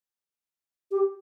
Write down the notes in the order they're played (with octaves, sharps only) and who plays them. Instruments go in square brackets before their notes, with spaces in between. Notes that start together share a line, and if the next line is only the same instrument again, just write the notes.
[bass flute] G4